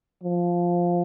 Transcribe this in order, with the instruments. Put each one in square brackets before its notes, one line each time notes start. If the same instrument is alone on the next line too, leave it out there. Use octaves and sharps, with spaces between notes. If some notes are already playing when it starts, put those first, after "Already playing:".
[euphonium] F3